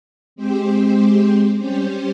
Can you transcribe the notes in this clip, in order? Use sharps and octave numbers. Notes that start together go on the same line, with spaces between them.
G#3 C4 G4 C5
G3 C#4 G4 C5